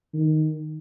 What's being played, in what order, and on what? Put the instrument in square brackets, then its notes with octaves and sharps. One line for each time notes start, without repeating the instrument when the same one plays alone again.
[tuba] D#3